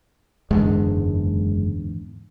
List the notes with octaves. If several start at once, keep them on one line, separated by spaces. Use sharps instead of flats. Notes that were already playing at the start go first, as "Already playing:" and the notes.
F#1 E2 G#2 D3 G#3